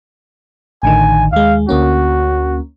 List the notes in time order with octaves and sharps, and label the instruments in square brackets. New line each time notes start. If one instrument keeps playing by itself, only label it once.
[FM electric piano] A1 D3 D#3 [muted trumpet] G#5
[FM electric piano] D#2 G#3 [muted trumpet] F5
[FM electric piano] D2 A#3 C#4 [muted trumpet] F#4